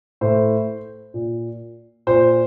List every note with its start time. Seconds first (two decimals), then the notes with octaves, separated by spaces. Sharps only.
0.21 A2 C5
1.14 A#2
2.07 A#2 C5